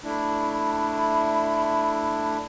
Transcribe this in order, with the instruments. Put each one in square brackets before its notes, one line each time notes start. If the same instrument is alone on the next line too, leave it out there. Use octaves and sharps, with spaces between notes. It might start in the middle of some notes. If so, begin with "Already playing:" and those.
[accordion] A3 D4 E4 [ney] B5